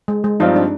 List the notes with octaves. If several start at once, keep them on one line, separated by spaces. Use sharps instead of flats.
G#3
G#3
G2 F3 C4 D#4 F4
D4